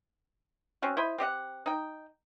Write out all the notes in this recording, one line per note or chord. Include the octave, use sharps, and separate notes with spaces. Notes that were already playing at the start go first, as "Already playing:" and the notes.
C4 C#4 F#4
E4 C5 D#5 B5
C4 G4 D#5 F#5
D#4 G5